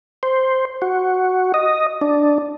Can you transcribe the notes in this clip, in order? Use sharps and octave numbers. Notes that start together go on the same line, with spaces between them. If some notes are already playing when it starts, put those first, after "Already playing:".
C5
F#4
D#5
D4